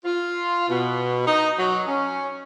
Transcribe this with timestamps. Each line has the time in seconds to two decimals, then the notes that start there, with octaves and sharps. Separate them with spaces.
0.05 F4
0.69 B2
1.27 D#4
1.58 F#3
1.88 C#4